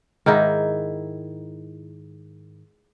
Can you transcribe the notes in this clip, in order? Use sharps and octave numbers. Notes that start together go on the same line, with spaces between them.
G#2 D#3 D#4 E4